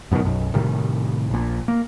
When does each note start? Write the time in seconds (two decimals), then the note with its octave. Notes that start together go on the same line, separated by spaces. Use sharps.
0.12 F#2 B2 D3 D#3
0.25 B1 F#2
0.53 A2 C3 D#3 G3
1.30 A#1 A#2
1.68 A#3